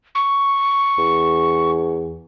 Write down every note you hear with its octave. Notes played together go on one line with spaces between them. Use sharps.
C#6
E2